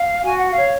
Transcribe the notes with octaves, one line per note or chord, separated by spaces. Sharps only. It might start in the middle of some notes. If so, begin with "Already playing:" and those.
Already playing: F5
F#4 G#5
F#5
F5
C#5